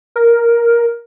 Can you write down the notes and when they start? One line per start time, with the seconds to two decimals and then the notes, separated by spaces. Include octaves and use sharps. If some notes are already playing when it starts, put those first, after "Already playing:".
0.16 A#4